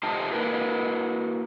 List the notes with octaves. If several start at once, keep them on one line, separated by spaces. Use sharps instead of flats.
A3 D#4 F4 G4 C5 A5
A#3 E4 F#4 A#4 B4